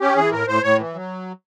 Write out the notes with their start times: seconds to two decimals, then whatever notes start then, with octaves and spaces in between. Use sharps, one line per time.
0.01 C#4 G4
0.16 E3 G#4
0.32 A2 A#4
0.47 A2 C5
0.63 A2 C#5
0.78 E3
0.94 F#3